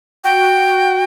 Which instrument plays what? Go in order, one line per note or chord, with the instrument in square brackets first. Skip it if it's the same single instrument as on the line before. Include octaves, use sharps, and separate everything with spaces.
[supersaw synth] F#4 [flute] G5